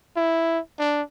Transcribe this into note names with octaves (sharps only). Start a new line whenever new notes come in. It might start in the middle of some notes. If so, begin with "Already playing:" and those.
E4
D4